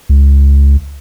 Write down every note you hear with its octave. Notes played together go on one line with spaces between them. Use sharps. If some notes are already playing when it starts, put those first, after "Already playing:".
C#2